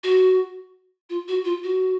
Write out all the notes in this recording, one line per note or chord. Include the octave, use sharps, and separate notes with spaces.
F#4
F4
F#4
F4
F#4